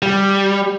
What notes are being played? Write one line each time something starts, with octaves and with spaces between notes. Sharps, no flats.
G3